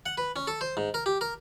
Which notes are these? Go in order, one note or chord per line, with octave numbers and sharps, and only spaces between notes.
F#5
B4
C#4
A4
C5
G#2
A#4
G4
A#4